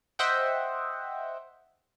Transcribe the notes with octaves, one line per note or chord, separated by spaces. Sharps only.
C5 D#5 E5 F#5 G5